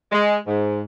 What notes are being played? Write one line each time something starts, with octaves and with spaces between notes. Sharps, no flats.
G#3
G#2